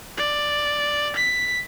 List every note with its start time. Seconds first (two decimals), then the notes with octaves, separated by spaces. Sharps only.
0.17 D5
1.16 B6